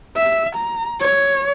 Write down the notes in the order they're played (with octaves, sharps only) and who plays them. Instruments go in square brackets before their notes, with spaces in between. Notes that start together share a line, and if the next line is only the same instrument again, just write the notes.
[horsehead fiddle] E5
A#5
C#5